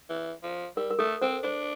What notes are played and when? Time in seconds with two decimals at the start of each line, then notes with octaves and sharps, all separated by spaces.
0.10 E3
0.43 F3
0.77 G3 A#4
0.91 A#4
0.99 A3 A4
1.22 C4 C5
1.43 D4 C5